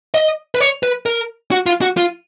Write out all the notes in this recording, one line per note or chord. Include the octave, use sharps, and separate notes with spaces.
D#5
B4
C#5
B4
A#4
F#4
F4
F#4
F4